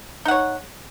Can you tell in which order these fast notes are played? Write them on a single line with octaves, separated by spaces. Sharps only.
D#4 F#5 C#5